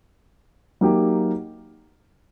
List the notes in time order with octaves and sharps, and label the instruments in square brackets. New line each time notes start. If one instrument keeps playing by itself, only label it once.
[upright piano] F#3 A#3 D#4 G4